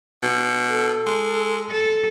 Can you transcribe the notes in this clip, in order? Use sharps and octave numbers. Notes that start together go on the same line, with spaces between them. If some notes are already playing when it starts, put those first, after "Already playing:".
B2
A4
G#3
A4